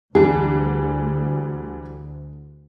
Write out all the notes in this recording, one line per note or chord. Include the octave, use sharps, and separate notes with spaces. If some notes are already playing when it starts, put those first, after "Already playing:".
D2 D3 E3 G3 G#4